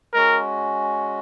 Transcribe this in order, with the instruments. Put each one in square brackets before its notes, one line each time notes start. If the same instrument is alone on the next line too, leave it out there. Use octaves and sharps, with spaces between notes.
[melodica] G#3 C#4 F#4 [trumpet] A#4